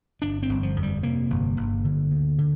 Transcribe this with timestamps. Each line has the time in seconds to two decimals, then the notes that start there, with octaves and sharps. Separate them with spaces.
0.22 G1 D4
0.43 C4
0.49 G1
0.63 F3
0.76 F2
0.83 G3
1.03 C3 A#3
1.30 G1
1.57 G1
1.84 D3
2.11 D2
2.38 D3